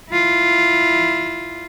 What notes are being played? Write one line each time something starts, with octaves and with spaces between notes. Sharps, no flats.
E4 F4